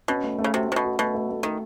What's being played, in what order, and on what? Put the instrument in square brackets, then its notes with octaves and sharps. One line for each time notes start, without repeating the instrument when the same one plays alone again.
[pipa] B2 [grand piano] C#4
[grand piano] A3
A3
[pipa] C#3
[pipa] C3 [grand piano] F#4
[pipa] C3 [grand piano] A3
[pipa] B2
[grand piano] F#4
[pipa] B2 [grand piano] A3
[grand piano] A3
A3
[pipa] D#3 [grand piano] A3